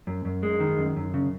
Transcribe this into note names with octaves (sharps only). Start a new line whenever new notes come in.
F#2
F#2
G#3
D#3
F#2
F#2
C#3